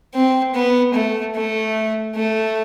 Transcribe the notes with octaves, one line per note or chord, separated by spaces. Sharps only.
C4
B3
A3
A3
A3